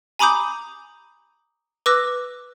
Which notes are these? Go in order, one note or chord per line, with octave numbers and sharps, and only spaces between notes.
G#5 A#5 B5 D6 D#6 G6
B4 D6 E6 F#6 A#6